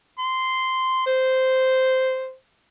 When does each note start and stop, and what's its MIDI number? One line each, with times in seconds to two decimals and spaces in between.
0.19 1.04 84
1.07 2.34 72